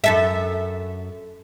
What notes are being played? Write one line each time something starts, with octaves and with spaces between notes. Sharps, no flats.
F#2 A4 E5